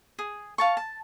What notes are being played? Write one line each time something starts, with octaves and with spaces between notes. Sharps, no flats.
G#4
F5 A5 C#6
A5